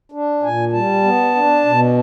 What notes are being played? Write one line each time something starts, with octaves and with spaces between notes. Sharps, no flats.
D4
A#2 G#5
G3 A5
B3
D4
B2